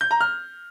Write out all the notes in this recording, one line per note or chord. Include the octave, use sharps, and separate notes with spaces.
G6
A#5
F6